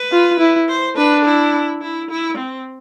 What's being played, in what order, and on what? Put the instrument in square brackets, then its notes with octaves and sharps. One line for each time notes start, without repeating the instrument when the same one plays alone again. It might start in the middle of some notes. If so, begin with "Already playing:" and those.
Already playing: [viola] B4
[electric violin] F4
E4
[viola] C5
[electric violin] D4 [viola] B4
[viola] E4
E4
E4
C4